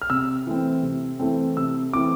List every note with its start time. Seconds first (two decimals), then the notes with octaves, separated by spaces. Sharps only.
0.02 F6
0.10 C3 E6
0.47 E3 A3 C4
0.83 C3
1.20 E3 A3 C4
1.57 C3 E6
1.93 E3 A3 C4 D6